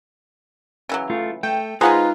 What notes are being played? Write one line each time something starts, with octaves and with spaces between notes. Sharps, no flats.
C#3 E3 F#3
A3 F4
A3 G5
G#3 D#4 F4 B4 C5 F#5 G#5 A#5